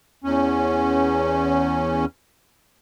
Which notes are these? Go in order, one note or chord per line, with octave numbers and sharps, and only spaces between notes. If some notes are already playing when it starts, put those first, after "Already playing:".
E2 C#4